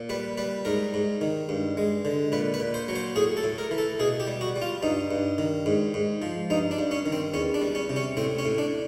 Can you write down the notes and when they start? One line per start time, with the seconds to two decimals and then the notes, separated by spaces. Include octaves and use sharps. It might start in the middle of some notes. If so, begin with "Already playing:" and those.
Already playing: A#2
0.09 G3 B4
0.38 G3 B4
0.65 G#2 A#4
0.94 G#2
1.21 D#3
1.49 G2
1.77 G#3
2.05 D3
2.32 A#2 B4
2.54 B4
2.60 A#2
2.74 C5
2.88 F#3
2.96 C5
3.16 A2 G#4
3.37 A4
3.44 A2
3.58 A#4
3.71 E3
3.78 A4
3.99 B2 G#4
4.20 G4
4.27 G3
4.41 F#4
4.56 G3
4.62 F4
4.83 G2 D#4
5.11 G2
5.38 D#3
5.66 G#2
5.94 G#2
6.22 F3
6.50 G2 D#4
6.71 D4
6.78 G2
6.91 C#4
7.06 D#3
7.12 C4
7.34 E2 C#4
7.54 D4
7.61 G3
7.75 C#4
7.89 C3
7.96 C#4
8.17 A2 C4
8.39 C#4
8.45 A2
8.58 D4